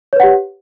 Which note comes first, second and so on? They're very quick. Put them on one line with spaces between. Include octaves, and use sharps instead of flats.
C#5 B4 F#5 G4